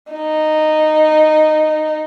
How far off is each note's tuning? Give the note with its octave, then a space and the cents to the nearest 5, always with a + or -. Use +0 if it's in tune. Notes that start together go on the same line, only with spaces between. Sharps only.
D#4 -10